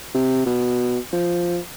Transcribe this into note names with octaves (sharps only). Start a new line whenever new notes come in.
C3
B2
F3